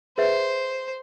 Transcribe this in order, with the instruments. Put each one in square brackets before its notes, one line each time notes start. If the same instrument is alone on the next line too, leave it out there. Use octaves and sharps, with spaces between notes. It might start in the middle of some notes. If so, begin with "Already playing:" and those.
[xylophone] G#4 B4 E5 [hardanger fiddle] C5